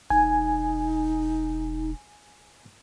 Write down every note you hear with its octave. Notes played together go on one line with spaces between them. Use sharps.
E1 D#4 G#5